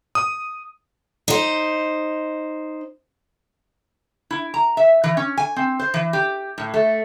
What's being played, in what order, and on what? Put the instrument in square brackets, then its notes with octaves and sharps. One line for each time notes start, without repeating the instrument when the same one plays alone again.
[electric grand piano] D#6
[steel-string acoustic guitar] D#4 C5
[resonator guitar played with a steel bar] E4
A#5
E5
E3
C#4
G#5
C4
C5
E3
G4
A2
A3